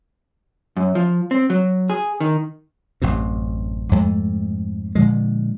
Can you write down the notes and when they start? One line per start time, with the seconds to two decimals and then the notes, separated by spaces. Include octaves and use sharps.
0.77 F#2
0.95 F3
1.31 C4
1.50 F#3
1.90 G#4
2.20 D#3
3.02 A1 F#2 C3
3.91 F2 G#2 A3
4.95 A#2 D3 F3 G#3